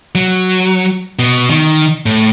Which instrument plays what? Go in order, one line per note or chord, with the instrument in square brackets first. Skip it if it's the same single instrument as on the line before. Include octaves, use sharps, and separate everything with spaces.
[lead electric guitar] F#3
B2
D#3
A2